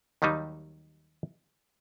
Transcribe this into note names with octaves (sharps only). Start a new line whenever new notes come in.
D#2 D#3 F#3 G3 D#4